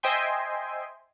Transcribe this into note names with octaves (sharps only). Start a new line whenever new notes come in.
C5 D#5 E5 G5 G#5 C6